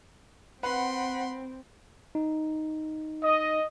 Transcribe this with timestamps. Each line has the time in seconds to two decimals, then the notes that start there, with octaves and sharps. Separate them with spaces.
0.63 C4 B4 F#5 B5 C6
2.15 D#4
3.23 D#5